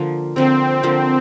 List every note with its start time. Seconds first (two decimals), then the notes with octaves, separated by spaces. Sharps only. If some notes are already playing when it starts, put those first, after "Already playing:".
Already playing: D3 F3 A#3
0.35 D3 F3 A#3 C4
0.83 D3 F3 A#3